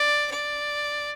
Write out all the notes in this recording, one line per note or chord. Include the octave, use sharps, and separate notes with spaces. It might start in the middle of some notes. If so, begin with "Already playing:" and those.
Already playing: D5
D5